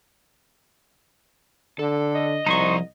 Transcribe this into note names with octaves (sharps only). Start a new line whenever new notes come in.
D3 A4
D#5
C2 F3 D#4 C5 A#5 C#6